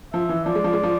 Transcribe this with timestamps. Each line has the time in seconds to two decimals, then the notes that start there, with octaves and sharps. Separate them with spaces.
0.13 F3 E5
0.29 E3
0.45 F3 D5
0.55 G#3
0.64 F3
0.73 G#3
0.83 F3